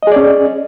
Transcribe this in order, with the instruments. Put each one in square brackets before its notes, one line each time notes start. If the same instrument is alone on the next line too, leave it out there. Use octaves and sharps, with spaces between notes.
[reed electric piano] D#5
G#4
D5
C#4